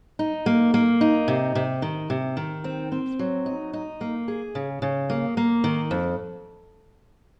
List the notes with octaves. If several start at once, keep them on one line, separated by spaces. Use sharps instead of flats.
D#4
A#3
A#3
D#4
C3
C3
D#3
C3
D#3
C4
C4
F#3
D#4
D#4
A#3
G#4
C#3
C#3
A#3
A#3
D#3
F2